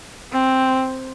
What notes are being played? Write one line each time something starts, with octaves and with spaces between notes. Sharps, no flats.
C4